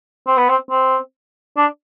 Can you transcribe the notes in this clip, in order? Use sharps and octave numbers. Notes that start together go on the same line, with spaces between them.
C4
B3
C4
C4
D4